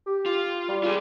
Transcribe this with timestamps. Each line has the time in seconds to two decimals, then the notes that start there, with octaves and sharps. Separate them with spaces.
0.06 G4
0.26 F4
0.68 G3
0.83 F4 G#4